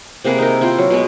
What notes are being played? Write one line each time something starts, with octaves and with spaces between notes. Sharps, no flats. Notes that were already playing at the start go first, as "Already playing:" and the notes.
C3 A#3 G#4 B4
D#4 E4 A#4
E4 F4 G5
F#3
B2 G#3 B4